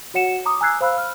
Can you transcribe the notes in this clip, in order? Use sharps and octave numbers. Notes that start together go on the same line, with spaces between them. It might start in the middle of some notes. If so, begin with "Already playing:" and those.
F#4 C#5 F#5 C#7 E7
A#5 D6 D#6
G#5 A#5 E6 F#6 G#6 C7
C5 F5 B5 E6 F#6
F6